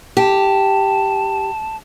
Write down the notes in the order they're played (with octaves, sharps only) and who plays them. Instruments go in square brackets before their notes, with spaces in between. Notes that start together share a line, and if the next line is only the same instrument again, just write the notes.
[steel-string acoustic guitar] G4 [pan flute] A5